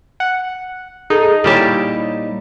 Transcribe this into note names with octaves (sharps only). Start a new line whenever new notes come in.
F#5
D#4 G#4 A4
A#2 G3 E4 G4 C#5 A5